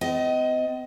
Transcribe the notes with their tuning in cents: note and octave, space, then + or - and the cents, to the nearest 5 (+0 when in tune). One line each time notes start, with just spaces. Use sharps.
C4 -45 D#5 +15